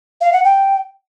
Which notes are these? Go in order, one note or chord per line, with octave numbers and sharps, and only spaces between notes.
F5
F#5
G5